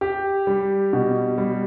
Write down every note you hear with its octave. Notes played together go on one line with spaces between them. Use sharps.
G4
G3
B2
G3